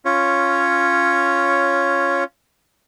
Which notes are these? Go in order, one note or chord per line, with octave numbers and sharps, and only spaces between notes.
C#4 F4 C#5